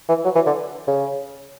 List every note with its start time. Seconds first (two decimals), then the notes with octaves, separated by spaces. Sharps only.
0.09 E3
0.25 F#3
0.35 E3
0.46 D3
0.88 C#3